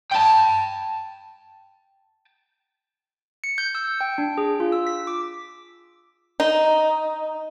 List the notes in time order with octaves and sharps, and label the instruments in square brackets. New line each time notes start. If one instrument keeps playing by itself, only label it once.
[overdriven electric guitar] G5 A5
[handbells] C#7
G6
E6
G5
D4
G#4
F4
E6
B6
D6
[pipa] D#4